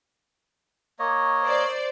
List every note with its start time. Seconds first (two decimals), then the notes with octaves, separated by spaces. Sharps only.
0.99 A#3 C#5 D#5
1.42 C5 D5